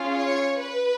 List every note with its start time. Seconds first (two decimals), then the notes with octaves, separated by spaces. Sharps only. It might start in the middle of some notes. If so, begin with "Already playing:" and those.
Already playing: C#4 F4 G#4
0.15 C#5
0.62 B4